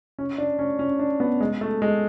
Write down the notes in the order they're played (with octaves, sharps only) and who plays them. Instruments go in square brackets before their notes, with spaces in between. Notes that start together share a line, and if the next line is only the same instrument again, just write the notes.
[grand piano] C#4
D4
C#4
C#4
D4
B3
G#3
A3
G#3